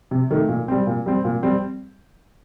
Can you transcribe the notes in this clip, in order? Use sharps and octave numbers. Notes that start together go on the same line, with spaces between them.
C3
D#3 A3
A#2
G3 C4
A#2
G3 C4
A#2
G3 C4